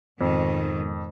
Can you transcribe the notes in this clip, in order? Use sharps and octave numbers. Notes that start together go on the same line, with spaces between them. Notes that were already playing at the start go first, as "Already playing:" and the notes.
F2 G#2 B2 D#3